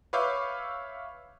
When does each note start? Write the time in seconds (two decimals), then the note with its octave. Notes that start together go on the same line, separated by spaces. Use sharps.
0.13 B4 C#5 E5 F5 D6 G6